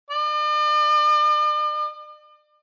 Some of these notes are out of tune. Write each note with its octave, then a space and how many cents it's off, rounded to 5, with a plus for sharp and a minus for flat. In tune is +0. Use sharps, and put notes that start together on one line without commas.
D5 +45